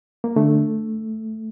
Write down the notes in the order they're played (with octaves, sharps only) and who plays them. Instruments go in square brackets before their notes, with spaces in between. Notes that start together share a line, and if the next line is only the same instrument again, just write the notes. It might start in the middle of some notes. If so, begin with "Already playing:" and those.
[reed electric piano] A#3
[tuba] D3 [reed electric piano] A3